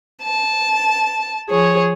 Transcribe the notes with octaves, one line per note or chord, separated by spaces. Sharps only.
A5
F3 G#4 C#5